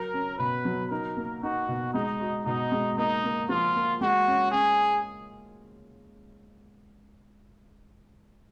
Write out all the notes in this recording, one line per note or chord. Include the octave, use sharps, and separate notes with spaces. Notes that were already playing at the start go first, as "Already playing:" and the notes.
Already playing: F#3 A#4
C#4
B2 B4
F#3
D#4 A#4
A#3
D#4 F#4
B2
G#3 D#4
F#4
B2 D#4
G#3
A#3 D#4
A#3
F3 F4
A#3
G#3 F#4
C#4
C#4 G#4